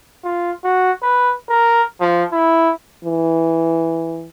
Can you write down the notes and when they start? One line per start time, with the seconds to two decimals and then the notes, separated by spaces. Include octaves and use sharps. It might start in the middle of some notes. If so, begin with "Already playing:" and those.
0.24 F4
0.65 F#4
1.03 B4
1.49 A#4
2.01 F3
2.33 E4
3.05 E3